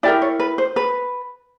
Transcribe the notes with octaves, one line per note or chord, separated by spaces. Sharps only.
E4 G4 A#4 D5
C#5
B4
C5
B4